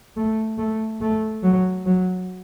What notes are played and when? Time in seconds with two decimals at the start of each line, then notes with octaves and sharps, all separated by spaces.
0.16 A3
0.58 A3
1.01 A3
1.43 F#3
1.86 F#3